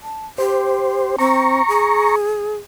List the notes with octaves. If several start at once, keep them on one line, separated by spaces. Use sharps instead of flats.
A5
G4 C5
C4 A#5 C#6
G#4